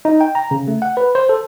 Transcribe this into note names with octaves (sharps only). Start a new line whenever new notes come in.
D#4
G5
A#5
C#3
A3
F#5
B4
C5
A4